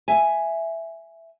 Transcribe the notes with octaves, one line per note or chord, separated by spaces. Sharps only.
E5 G#5